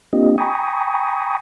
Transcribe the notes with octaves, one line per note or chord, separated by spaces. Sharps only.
A#3 C4 D4 F4 G4 D#5
G5 G#5 A#5 B5 C#6 D#6